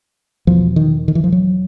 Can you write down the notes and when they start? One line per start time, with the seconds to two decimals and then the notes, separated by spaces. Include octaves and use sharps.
0.47 E2 B2 F3
0.76 D#3
1.08 D#3
1.15 E3
1.24 F3
1.32 F#3